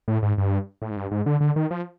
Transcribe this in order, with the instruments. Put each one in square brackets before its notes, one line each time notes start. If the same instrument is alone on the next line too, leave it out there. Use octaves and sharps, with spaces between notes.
[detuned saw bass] A2
G#2
G2
A2
G#2
G2
G#2
D3
D3
D#3
F3